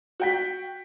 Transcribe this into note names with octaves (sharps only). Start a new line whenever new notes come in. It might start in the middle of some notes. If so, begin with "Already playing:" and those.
F#4 G5 B6